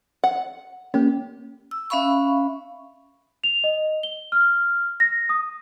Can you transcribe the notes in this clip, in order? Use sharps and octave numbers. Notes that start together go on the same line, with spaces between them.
F#5
A#3 C#4 G4
E6
C#4 E5 F5 B5 C#6
F7
D#5
G7
F6
A#6
D#6